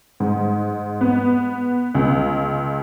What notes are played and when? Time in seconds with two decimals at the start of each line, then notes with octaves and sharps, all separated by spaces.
0.20 G#2
1.01 B3
1.95 C#2